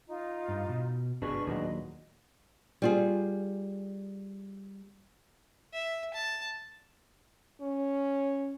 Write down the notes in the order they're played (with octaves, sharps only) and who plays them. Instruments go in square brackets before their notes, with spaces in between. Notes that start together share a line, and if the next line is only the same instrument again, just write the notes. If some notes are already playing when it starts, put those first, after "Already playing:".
[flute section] D#4 F4
[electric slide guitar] G2
B2
[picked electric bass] G1 B2 [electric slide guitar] D4 G#4 B4 [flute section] C#6
[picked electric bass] D#2 A#2 F#3 [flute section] D#5
[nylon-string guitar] G3 F4 G#4
[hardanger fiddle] E5
A5
[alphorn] C#4